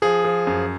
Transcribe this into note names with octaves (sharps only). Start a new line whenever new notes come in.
F3 G#4
F3
F#2